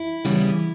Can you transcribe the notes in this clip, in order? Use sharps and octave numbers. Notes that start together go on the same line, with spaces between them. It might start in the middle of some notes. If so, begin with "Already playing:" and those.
Already playing: E4
C#3 E3 G3 B3